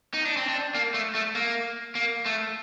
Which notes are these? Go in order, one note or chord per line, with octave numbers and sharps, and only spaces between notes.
D#4
D4
C4
D4
A#3
A3
A3
A#3
A#3
A3